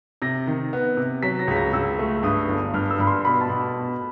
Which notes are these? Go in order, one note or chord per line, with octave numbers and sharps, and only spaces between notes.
C3 A#6
D#3
B3
C3
F#3 B6
A#6
C#2 B6
A#6
C#2 E6
A3
G2 D#6
G1
G2 F6
E6
G2 B5
C6
B2 B5
A5
B2